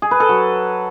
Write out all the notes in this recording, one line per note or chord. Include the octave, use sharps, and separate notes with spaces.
G#4
B4
A4
F#3